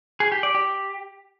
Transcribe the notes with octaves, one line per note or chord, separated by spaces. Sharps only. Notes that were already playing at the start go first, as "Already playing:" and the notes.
G#4
G4
D5
G4